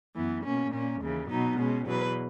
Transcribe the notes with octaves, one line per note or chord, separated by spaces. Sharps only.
F#2 E3 B3
B2 A#3 C#4
A#2 A#3 C#4
D#2 C#3 E3
B2 F#3 B3 D#4
B2 G#3 C#4
E2 B2 F#3 B4